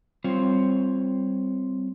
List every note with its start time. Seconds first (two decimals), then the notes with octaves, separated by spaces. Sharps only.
0.24 G3 C4 F4 C5 C#5